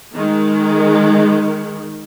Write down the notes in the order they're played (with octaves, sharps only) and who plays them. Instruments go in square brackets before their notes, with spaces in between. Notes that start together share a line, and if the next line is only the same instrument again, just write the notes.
[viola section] D#3 G#3